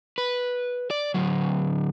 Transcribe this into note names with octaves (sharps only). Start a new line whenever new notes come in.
B4
D5
D2 F#3